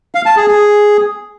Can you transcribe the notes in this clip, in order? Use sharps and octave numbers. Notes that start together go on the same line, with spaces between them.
F5
A5
G#4
G#4